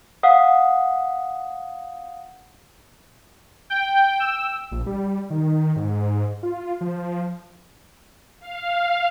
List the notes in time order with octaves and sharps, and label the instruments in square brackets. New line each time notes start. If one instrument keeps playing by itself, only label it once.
[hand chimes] F5 F#5 D#6
[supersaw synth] G5
E6
[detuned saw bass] A#1
G3
D#3
G#2
F4
F3
[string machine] F5